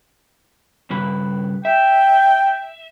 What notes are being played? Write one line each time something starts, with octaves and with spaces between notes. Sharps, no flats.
G2 C#3 B4
E5 G5